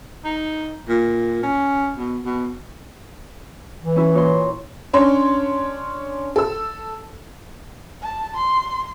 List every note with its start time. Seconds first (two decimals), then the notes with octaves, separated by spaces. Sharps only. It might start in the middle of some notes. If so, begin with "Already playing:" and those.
0.25 D#4
0.89 A#2
1.43 C#4
1.98 B2
2.25 B2
3.84 E3
3.96 C#4 E4
4.14 A#2 C#5 C6
4.93 C#4 D4 C#5 C6
6.36 A4 E6
8.02 A5
8.36 C6